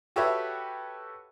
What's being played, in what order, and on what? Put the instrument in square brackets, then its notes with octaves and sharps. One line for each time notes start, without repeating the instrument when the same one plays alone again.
[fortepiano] F#4 G4 A4 B4 C#5 E5